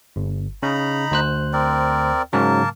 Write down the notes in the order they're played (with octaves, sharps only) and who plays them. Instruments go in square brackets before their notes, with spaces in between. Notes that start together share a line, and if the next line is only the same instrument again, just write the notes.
[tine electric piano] G1
[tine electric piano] C#3 [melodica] D#4 A#5 B5
[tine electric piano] D2 C5 F#6
[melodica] C4 A#4 D5
[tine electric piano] G#2 C#3 F#3 [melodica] A#3 A#4 A5